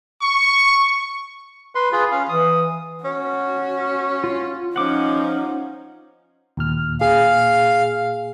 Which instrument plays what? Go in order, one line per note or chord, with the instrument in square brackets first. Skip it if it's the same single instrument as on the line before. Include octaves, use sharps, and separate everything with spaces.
[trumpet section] C#6
[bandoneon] B4 C6
F4 G#4 B4
C#4 F5
[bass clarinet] E3 [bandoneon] D#6
[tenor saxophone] C#4 [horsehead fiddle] F#4
[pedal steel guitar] F4
[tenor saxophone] F3 [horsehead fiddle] C#4 D#4 [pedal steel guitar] F#5 D6
[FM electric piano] D#2 A#2 F6
[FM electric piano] A#2 G#4 [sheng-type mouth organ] F5